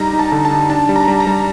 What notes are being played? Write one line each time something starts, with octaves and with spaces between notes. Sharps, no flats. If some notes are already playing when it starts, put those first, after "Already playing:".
Already playing: G3 D#4 A#5
D#4
A5
D3
A5
D#4
D4 A5
G3
A#5
G3
A#5
G3